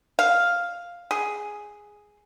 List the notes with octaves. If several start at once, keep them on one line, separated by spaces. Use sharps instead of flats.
F5
G#4